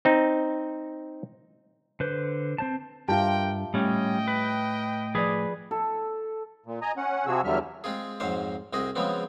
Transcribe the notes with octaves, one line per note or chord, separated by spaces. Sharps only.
C4 D#4
D3 B4 C5
C4 C5 A5
G2 F4 G4 A#4 E5 G5 A5
A2 G3 C#4 D#5 G5
B4
F3 G#4 B4 D5
A4
A#2
D#5 G#5 A#5
C#4 F#5
C3 F3 F#4 G#4 E6
E2 D3 F#3 G3 E5 F6
G#3 C4 F4 G#4
F2 G#2 F#3 C5 F5
C2 C4 F#4 G#4 D#5
C#3 F3 F#3 G#3 B3 C4